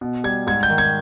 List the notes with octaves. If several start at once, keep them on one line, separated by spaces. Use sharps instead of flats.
B2
G3 G#6
G#2 G#6
G6
D#3
G#6